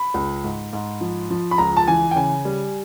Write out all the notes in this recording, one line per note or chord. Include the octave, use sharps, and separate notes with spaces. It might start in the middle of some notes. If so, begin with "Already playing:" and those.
Already playing: B5
C#2
G#2
G#2
F3
F3
B5
C#2 A#5
A5
E3 G#5
G5
C#3 G#5
G3